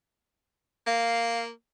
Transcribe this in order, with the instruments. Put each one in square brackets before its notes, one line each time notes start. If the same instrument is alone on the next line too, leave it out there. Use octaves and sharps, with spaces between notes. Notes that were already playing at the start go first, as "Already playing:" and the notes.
[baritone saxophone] A#3 [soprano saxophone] F5